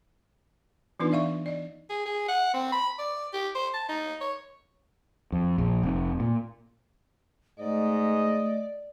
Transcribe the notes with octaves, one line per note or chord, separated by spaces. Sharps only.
E3 B3 D4 D#4 F4 B4
D5 E5 F5 C#6
D5 D#5
G#4
G#4
F#5
C4
B5
D5
G4
C5
A5
D#4
C#5
F2
A#1
F1
A#2
G#2 A3 D5 D#5